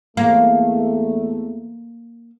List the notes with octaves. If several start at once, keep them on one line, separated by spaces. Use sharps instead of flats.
E2 A3 A#3